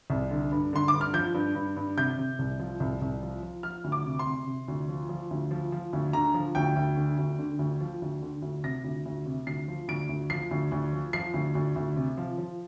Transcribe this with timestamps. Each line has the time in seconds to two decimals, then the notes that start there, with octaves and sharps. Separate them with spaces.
0.10 C2
0.31 D3
0.52 G2
0.73 D3 C6
0.88 G2 D6
1.01 F6
1.13 F3 G6
1.34 G2
1.55 G2
1.76 G2
1.97 C3 G6
2.18 C3
2.39 C2
2.59 F3
2.80 C2
3.02 C2
3.22 F3
3.42 F3
3.63 F3 F6
3.84 D2
3.92 D6
4.05 C3
4.19 C6
4.26 C3
4.47 C3
4.68 D2
4.89 F3
5.09 F3
5.31 D2
5.51 F3
5.72 F3
5.93 D2
6.13 D3 A#5
6.34 F3
6.55 D2 G5
6.76 D2
6.97 D3
7.18 D2
7.39 D3
7.59 D2
7.81 F3
8.02 D2
8.22 D3
8.42 D2
8.64 C3 A#6
8.84 D2
9.06 D2
9.26 C3
9.47 D2 C7
9.68 F3
9.88 D2 D7
10.09 D2
10.30 F3 C7
10.51 D2
10.72 D2
10.92 F3
11.13 F3 C7
11.34 D2
11.55 D2
11.76 D2
11.96 C3
12.17 F3
12.38 F3